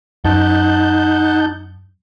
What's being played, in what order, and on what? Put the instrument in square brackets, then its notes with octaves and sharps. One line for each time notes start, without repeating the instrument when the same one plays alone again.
[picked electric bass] F#2 [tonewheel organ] D#4 G6 [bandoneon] F#5 A5